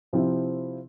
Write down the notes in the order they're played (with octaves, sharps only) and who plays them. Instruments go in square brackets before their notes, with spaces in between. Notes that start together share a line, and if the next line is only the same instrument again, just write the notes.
[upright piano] C3 F3 C4 E4